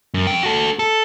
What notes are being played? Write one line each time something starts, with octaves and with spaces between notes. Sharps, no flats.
F#2
F2 G5
F#4 A4
A4